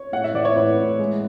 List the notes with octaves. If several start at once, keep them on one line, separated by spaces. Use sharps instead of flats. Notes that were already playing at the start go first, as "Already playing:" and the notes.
Already playing: C#5
A2 F#5
E5
E3 D5
C#5
A2 B4
A2
G#3